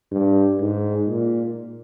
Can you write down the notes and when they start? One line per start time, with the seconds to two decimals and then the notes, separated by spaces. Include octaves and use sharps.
0.12 G2
0.61 G#2
1.09 A#2